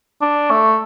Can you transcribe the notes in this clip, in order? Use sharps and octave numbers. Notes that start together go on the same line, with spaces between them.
D4
A3